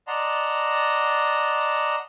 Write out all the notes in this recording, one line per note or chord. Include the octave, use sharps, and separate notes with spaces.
D5 D#5 F#5 A5 A#5 C6